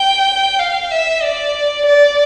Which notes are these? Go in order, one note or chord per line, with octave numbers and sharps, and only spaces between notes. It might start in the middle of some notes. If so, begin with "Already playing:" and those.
Already playing: G5
F5
E5
D5
D5